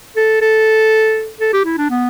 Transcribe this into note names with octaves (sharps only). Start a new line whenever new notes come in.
A4
A4
A4
G4
E4
D4
B3